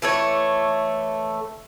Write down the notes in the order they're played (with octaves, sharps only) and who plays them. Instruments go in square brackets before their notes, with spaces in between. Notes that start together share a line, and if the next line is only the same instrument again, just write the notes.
[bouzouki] E3 A3 C#5